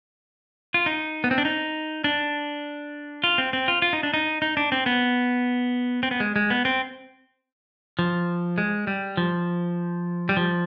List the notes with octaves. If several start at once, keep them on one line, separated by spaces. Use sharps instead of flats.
F4
D#4
B3
C4
D4
D#4
D4
F4
C4
C4
F4
F4
D#4
D4
D#4
D#4
D4
C4
B3
C4
B3
G#3
G#3
B3
C4
F3
G#3
G3
F3
G3
F3